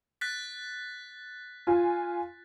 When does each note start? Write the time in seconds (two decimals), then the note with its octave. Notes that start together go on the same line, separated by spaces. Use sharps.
0.21 F#6 A6 B6
1.67 F4 G#5